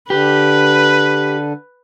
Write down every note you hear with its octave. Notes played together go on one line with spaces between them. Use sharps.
D3 G4 B4